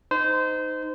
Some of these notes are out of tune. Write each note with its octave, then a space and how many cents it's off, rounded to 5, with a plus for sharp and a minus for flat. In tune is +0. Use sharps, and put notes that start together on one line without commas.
D#4 +0 C5 -25